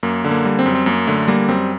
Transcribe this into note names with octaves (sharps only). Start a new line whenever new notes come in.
F#2 A#3
D3
A#3
G3
C4
F#2
C4
F#2 A#3
D3 A3
G3 A#3
F#2 C4